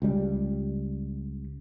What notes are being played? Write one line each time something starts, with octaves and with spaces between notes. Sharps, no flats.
C#2 G3